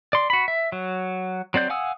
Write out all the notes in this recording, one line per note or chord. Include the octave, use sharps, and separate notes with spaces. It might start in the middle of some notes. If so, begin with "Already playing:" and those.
D5 C6
F#4 B5
E5
F#3
F#3 C4 D5 G6
F5 F#5 G#5 D#6 E6